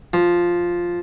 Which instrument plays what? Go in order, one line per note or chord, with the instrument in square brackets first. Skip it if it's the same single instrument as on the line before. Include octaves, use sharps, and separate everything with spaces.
[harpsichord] F3